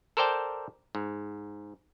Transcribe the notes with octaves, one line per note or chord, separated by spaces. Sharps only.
A4 A#4 C5 D5 G5 A5
G#2